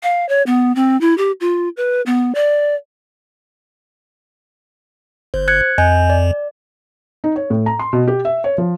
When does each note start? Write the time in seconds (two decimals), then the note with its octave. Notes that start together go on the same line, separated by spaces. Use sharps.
0.03 F5
0.29 C#5
0.46 B3
0.76 C4
1.01 E4
1.18 G4
1.41 F4
1.77 B4
2.06 B3
2.35 D5
5.34 G1 C5
5.48 F#6 G#6 C#7
5.78 F2 D#5 G#5 G6
6.10 D5
7.24 D#4
7.36 C#5
7.50 A2
7.66 A#5
7.79 C6
7.93 B2
8.08 G4
8.25 E5
8.44 C#5
8.58 F3